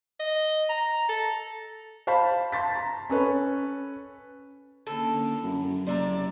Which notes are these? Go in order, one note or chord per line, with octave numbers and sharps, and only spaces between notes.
D#5
A#5
A4
C5 F5 A5 B5 B6
A5 C6 A6 B6
A#5
C#4 A4 B4 C#5
A2 D3 A#3 C#4 A4
F#2 F#3
F#1 C3 D5 E5 A#5